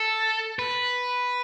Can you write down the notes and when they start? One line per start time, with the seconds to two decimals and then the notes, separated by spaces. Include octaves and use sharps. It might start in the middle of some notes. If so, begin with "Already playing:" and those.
Already playing: A4
0.59 B4